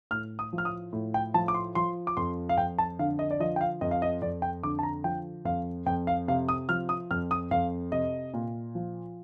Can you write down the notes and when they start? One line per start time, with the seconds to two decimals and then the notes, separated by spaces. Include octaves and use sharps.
0.11 A2 F6
0.39 D#6
0.53 F3
0.58 F6
0.65 D#6
0.93 A2
1.14 G5
1.34 F3 A5
1.48 D6
1.54 C6
1.75 F3 C6
2.07 D6
2.17 F2 C6
2.49 F5
2.58 F2 G5
2.78 A5
2.99 D3 F5
3.19 D#5
3.31 D5
3.40 F3 D#5
3.56 G5
3.61 F5
3.81 F2 D#5
3.91 F5
4.02 D#5
4.22 F2 D5
4.42 G5
4.63 D3 D6
4.79 A5
4.83 A#5
5.04 F3 G5
5.45 F2 F5
5.86 F2 G5
6.07 F5
6.28 C3 F5
6.49 D#6
6.69 F3 F6
6.89 D#6
7.11 F2 F6
7.31 D#6
7.51 F2 F5
7.92 C3 D#5
8.34 A#2
8.75 F3